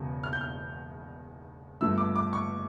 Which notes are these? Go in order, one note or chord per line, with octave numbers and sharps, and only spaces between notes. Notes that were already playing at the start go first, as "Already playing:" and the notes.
Already playing: E1 E2 C#3
F6
G6
F6
G1 G2 F3 A3 E6
D6
D6
C#6